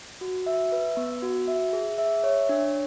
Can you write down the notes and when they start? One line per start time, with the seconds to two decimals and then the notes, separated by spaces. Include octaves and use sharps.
0.21 F#4
0.46 E5
0.72 B4
0.97 B3
1.22 F#4
1.48 E5
1.73 G#4
1.98 E5
2.24 C#5
2.49 D4